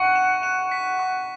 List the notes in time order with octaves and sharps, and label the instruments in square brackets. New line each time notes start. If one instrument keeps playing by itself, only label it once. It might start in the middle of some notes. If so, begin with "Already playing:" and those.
Already playing: [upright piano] F#5 [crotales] C#6
[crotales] E7
E7
B6
C#6